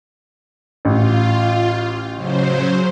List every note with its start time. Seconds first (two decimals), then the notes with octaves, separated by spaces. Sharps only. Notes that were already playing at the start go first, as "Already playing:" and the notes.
0.85 A1 F4
2.15 C#3 F#3 C5